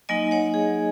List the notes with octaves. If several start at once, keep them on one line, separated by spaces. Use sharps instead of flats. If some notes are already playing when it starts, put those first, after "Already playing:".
F#3 A#3 D#4 D#5 G#5
C#5 F#5
G#4